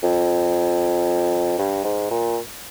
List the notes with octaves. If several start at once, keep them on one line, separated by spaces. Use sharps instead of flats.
F2
G2
G#2
A#2